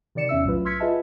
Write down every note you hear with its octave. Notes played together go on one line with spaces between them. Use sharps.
C3 D#3 D5 C#7 E7
E2 C#4 E5 E6
B1 A2 F#3 F4 B4
C6 E6 F6 G#6 B6 C#7
F4 G#4 B4 D#5 E5 A5